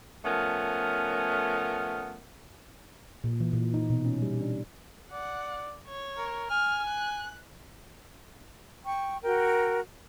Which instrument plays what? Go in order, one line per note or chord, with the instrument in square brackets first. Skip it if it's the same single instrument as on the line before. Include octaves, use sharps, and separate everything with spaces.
[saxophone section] F3 A3 B3 C#4 A#4
[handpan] A#2
E3
A#2
D#4
B2
C#4
G3
D4
[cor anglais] D5 [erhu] F#5
[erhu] C#5
[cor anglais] A#4
[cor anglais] G#5 [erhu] F6
[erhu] F#6
[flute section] G5 C#6
F#4 A#4 G5